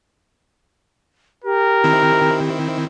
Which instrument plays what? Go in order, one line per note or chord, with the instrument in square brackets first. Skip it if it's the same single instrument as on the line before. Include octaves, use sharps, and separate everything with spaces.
[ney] G4 [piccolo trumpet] A#4
[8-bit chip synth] D#3 C4 E4